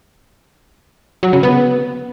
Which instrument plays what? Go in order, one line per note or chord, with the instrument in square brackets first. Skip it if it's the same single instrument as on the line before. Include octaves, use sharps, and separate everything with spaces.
[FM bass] F#3
C#3
B3